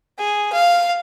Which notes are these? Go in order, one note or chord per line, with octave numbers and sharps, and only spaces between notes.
G#4
F5